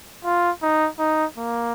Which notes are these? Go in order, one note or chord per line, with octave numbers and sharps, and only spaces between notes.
F4
D#4
D#4
A#3